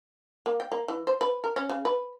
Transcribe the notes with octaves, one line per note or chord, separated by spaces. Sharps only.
A#3
G5
A#3
E3
C5
B4
A#4
C#4
C#3
B4